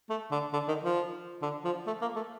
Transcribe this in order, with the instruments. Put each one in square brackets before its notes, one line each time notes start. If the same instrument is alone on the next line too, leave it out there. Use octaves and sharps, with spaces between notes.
[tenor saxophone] A3
D3
D3
D#3
F3
D3
F3
A3
A#3
A3